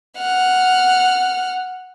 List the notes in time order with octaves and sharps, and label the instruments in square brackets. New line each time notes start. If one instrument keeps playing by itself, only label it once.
[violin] F#5 F6